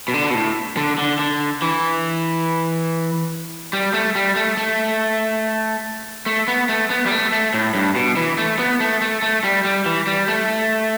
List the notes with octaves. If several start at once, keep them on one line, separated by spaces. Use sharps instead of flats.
B2
D3
B2
A2
D3
D3
D3
E3
G3
A3
G3
A3
A3
A3
B3
A3
B3
G3
A3
A3
A2
G2
B2
E3
A3
B3
A3
A3
A3
G3
G3
E3
G3
A3